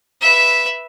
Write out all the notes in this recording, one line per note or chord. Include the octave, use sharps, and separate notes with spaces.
B4 E5